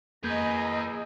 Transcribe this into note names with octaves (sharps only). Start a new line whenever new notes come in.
F2 A#3 G#4 B4 D#5 A#5 G6